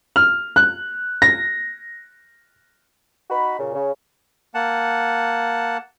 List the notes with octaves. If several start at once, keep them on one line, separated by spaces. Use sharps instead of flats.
F6
F#6
A#6
D#4 F#4 B5
A#2 C#3
C#3
A#3 F#5 A5